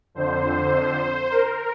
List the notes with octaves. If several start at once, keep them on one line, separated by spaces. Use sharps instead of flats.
F2 D3 C5
A#4